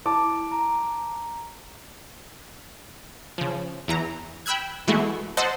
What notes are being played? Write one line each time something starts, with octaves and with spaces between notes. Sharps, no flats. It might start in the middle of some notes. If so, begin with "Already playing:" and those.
E4 A5 D6
A#5
C#3 F3
E2 E3 A#5
G5 B5 E6 F#6 G#6
B2 E3 G#3 A3 F#4
C5 D#5 F#5 A5 E6